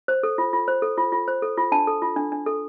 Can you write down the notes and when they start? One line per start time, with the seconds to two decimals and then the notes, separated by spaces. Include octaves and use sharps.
0.08 C5
0.23 A4
0.38 F4
0.53 F4
0.68 C5
0.82 A4
0.98 F4
1.12 F4
1.28 C5
1.42 A4
1.57 F4
1.72 D4 A5
1.87 A4
2.02 F4
2.16 D4
2.32 D4
2.46 A4